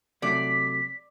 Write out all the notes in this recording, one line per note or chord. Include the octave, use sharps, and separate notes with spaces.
C3 F#3 A3 D5 B6